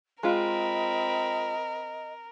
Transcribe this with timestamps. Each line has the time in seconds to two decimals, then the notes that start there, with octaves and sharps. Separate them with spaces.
0.23 G#3 C4 F4 A#4 D#5 B5